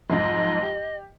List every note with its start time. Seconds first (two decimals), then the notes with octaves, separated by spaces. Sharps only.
0.10 B1 F2 G#2 D#5
0.62 G4